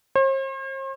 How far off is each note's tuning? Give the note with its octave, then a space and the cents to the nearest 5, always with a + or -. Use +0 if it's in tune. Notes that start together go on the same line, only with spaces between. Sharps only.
C5 +45